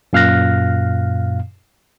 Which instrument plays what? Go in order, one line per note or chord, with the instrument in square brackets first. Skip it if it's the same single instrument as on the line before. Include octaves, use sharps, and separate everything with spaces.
[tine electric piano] F#2 A#2 F5 F6 F#6 A#6